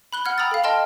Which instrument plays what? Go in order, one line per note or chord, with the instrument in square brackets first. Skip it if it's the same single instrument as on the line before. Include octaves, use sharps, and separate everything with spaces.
[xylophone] B5 F#6 G7
F#5 F6 G#6
G5 A#5 B5 D#6 E6 A6
A4 F5
D#5 G5 A5 C6 F6